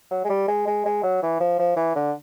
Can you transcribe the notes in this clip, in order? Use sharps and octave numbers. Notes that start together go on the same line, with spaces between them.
F#3
G#3
G3
G#3
G#3
G#3
F#3
E3
F3
F3
E3
D3